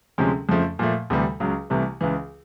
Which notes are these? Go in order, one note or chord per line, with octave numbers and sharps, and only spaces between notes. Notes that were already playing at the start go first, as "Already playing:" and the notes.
D2 C3 F3 G#3 C#4
F2 C#3 F3 A3
A#2 F3 A3
D2 C3 E3 G3
C#2 C#3 F#3
C2 C3 E3 A3
C#2 C#3 E3